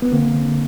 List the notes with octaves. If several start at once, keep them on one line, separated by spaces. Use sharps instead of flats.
B3
D3 A#3 C4
D3